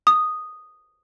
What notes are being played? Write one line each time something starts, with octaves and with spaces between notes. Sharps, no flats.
D#6